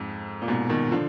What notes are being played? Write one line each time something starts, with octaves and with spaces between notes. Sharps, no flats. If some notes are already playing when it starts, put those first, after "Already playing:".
Already playing: F2 G#2
A#2
G#2 B2
B2 D#3
D3 F3